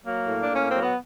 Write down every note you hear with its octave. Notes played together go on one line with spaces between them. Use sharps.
F#3 A#3
A2
D4
A2
C#4
F#3 C4
B3